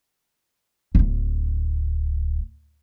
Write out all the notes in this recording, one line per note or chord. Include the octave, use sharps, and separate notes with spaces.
D1 G1